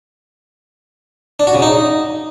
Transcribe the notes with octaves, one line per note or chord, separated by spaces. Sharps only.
D4
F#4
C#3
D#4